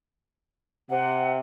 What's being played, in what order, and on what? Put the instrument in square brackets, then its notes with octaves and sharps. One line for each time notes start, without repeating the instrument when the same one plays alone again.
[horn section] C3 [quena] F#5